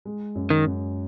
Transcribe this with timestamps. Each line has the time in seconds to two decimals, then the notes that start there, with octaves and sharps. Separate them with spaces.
0.05 G#3
0.35 F#2
0.50 D#3
0.66 F#2